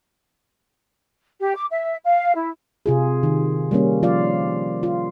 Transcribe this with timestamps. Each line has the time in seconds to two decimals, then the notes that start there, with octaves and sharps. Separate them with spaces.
1.41 G4
1.56 D6
1.71 E5
2.05 F5
2.35 E4
2.86 C3 F4 G#4
3.23 D#3
3.71 G3 A#3 C#4
4.03 F3 F4 D5 F5
4.83 F4